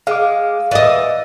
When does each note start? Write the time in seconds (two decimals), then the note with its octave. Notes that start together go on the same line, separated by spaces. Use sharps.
0.07 G#3 F5 D6
0.71 E3 D5 D#5